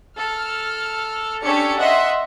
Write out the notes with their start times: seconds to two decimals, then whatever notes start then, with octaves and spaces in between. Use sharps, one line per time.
0.18 A4 F6
1.43 C#4 D4 G4 A4 C#5 C#7
1.79 D#5 E5 F#5 C6 F#6